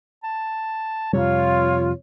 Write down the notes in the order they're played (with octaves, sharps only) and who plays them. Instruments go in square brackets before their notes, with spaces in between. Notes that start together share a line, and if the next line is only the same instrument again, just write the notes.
[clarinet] A5
[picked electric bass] F2 C3 G3 [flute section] F4 [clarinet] C#5